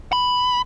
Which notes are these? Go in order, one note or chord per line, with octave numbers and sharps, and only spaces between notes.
B5